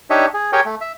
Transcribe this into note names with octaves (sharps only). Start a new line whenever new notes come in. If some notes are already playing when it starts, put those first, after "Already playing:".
D4 D#4 G4 C#5 D#5 E5
G#4
G4 G#4 A#4 C#5 G5 G#5
A3
E5